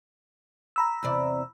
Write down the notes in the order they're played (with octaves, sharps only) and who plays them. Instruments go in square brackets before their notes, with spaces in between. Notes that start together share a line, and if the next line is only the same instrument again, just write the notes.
[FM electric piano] A#5 B5 E6
[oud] E2 C3 D5